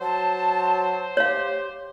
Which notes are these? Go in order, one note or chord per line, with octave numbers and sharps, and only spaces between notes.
F#3 C5 A5
G4 C#5 F5